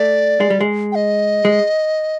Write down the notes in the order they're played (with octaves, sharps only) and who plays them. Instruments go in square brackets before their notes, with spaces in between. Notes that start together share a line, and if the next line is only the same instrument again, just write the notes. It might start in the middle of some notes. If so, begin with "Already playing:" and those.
Already playing: [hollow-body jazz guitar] A3 [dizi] D5
[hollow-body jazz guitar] G#3
G3
G#3
[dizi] G5
D#5
[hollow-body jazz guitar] G#3